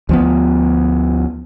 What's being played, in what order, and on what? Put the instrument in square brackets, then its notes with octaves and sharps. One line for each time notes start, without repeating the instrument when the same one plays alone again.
[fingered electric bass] D2 F3 B3